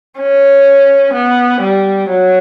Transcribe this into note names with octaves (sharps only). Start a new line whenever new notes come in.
C#4
B3
G3
F#3